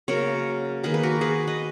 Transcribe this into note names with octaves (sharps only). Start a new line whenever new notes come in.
C#3 F#3 A#3 A#4 C#5
D#3 A#3 G#4 B4
B4
F#4 A#4
G#4 B4
B4 D#5